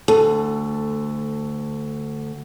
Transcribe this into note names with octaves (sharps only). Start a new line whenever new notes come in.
D2 A4